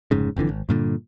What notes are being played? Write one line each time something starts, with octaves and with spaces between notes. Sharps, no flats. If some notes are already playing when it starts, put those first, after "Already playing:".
F1 G#2 C#3
F#1 F2 D3 E3
G#1
G2 A#2 D3